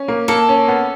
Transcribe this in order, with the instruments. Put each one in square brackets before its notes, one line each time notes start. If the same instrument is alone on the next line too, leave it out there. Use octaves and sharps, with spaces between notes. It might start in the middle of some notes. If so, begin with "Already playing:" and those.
Already playing: [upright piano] C#4
A#3
[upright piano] A#3 [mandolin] A4
[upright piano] C#4
B3